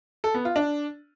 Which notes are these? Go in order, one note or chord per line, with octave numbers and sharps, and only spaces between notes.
A4
B3
F4
D4